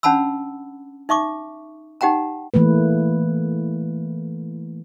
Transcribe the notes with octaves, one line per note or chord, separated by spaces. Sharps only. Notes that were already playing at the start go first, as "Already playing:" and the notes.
C#4 D4 F#5 A5 B5 E6
D#4 E5 C#6 D6
D#4 G4 F#5 G5 A#5
E3 A3 A#3 B4